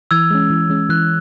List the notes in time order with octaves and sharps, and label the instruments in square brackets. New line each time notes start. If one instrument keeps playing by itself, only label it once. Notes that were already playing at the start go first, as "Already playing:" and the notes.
[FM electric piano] E3 [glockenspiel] E6 G#6
[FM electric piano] G#3 C#4
E3
G#3 C#4
[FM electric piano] E3 [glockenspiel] F#6